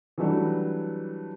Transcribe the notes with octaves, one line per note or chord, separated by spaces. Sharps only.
E3 F#3 G3 A3 D4